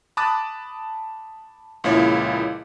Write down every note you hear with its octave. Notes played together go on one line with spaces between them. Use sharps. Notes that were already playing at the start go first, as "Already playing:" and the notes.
A5 B5 D6 D#6 F#6 A6
C#2 A#2 F3 E4 C#5